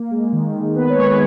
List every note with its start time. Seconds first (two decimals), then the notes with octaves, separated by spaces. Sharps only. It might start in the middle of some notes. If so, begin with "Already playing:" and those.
Already playing: A#3
0.11 G#3
0.33 D#3
0.55 D#3
0.76 B3 B4
0.90 C#5
0.98 G#3
1.04 B4